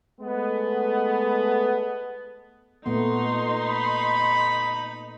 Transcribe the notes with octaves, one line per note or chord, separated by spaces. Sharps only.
G#3 A3 B3
A#2 A3 B3 D#4 C6
B5